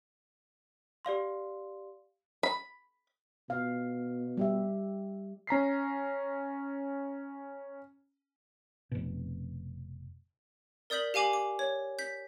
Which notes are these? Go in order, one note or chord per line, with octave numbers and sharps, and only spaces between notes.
G4 D5 F5 C6
B5
B2 F5
G3 G4 E5
C#4 A#5 B6 C7
F1 B2
A#4 D5 D#6 G6 B6 F#7
G4 F5 G#5 D6 F#7
D6
C#5
G6 B6